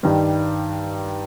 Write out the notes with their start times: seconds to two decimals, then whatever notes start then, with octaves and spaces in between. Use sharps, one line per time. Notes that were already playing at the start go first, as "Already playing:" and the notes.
0.03 G2 D#3 G3